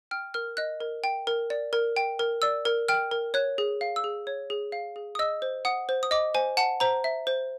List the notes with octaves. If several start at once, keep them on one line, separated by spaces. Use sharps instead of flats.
G5 F6
A#4 F6
D#5 F#6
A#4
G5
A#4
D5
A#4
G5
A#4
D5 E6
A#4
G5 F6
A#4
C#5 F#6
G#4
F5
E6
G#4
C#5
G#4
F5
G#4
D#6
D#5 E6
C5
F#5 D#6
C5
D#6
D#5 D6
C5 G#5
F#5 A5
C5 A#5
E5
C5